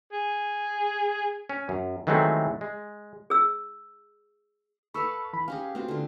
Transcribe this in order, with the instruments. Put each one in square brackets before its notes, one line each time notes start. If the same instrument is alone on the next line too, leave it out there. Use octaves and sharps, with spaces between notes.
[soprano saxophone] G#4
[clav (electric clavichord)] C#4
F#2
D#3 E3 F#3 G#3 A3 C4
G#3
[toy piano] G#4 E6
[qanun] A4 B4 F5 [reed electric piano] B5 C#6 E6
[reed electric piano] E3 B5
[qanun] C#4 G4 G#4 [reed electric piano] F5
[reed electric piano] A3 B3 F#4 [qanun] C4 F4 C5
[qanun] D3 F4